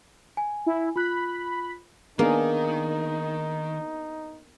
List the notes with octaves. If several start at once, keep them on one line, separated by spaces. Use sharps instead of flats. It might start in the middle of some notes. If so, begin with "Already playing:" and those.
G#5
E4
F4 B5 F#6
D#3 A#3 B3 D4 D#4 G#4